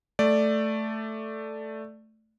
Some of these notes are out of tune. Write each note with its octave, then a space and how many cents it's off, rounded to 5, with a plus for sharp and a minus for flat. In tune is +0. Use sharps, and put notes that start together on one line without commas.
A3 +0 D5 +0